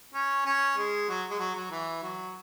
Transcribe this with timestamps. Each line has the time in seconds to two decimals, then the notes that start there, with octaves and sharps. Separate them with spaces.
0.14 C#4
0.45 C#4
0.77 G#3
1.09 F#3
1.30 G#3
1.39 F#3
1.55 F#3
1.71 E3
2.03 F#3